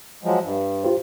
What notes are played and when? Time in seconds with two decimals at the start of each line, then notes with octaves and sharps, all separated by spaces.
0.23 F3 F#3 G#3
0.42 G2
0.83 F4 G4 C5